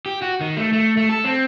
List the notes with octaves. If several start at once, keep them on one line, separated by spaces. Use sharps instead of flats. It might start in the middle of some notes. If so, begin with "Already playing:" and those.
G4
F#4
D#3
A3
A3
A3
A4
C4